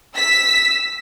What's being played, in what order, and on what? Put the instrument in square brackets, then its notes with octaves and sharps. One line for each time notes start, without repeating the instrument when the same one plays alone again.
[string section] E6 B6